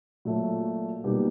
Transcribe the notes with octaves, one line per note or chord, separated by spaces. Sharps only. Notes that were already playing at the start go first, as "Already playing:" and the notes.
A#2 F#3 A3
B2 G3 A#3 D#4 G4